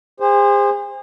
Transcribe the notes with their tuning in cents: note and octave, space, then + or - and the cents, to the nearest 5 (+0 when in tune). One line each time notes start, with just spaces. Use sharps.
G#4 -40 C5 +0